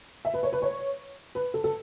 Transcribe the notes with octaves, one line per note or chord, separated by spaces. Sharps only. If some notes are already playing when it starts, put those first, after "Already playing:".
E5
B4
C#5
B4
C#5
B4
A4
A4